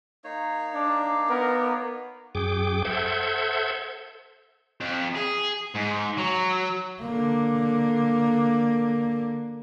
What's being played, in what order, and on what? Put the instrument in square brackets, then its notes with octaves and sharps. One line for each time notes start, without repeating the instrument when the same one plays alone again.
[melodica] A#3 D#4 C#5
[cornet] D4 [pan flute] D6
[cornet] B3 [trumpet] A#4
[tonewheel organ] F#2 G#4 G5 D6
A4 C5 E5 F#5 G6 G#6
[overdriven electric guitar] F2
G#4
G#2
F#3
[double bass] D3 A#3